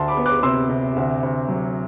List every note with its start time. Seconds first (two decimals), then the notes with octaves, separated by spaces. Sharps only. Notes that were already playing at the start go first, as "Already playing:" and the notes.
Already playing: D2 A5 C6
0.08 B5 D6
0.17 B3
0.26 D6 F#6
0.43 C3 C6 E6
0.70 C3
0.96 D2
1.23 D2
1.48 F#3